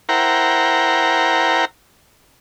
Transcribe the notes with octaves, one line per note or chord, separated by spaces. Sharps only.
E4 A#4 C5 F#5 G5 A#5